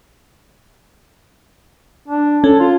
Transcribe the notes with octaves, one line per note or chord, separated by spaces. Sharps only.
D4
C#4 A4
F4